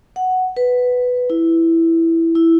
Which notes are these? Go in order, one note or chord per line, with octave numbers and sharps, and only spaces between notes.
F#5
B4
E4
E4